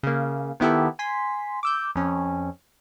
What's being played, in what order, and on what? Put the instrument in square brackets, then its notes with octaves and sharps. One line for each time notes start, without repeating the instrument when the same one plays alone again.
[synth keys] C#3 A#3
D#3 B3 E4 G4 A4
G#5 C6 B6
D6 E6 G6
F2 C#4